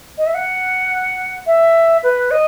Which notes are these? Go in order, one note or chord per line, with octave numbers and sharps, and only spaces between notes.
D#5
E5
F#5
E5
B4
D#5